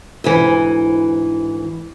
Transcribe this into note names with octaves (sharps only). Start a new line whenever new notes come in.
D2 G#2 E3